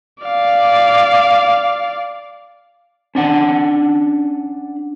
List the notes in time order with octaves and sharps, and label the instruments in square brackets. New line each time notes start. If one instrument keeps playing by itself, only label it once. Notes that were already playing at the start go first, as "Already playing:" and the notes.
[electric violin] D5 F5
[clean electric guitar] C#4 D4 F#5 A5